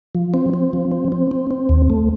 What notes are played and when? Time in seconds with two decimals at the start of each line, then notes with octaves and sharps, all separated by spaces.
0.15 F3
0.34 C4
0.54 C4
0.73 F3
0.91 C4
1.12 C4
1.31 C4
1.51 C4
1.69 D#2
1.90 A3